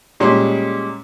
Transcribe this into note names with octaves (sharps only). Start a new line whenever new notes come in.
A#2 G3 G#3 C#4 C6